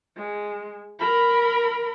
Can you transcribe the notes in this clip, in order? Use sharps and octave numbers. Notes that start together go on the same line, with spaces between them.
G#3
A#4 B5